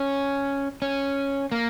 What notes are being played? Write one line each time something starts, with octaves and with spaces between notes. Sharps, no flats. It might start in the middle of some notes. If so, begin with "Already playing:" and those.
Already playing: C#4
C#4
A#3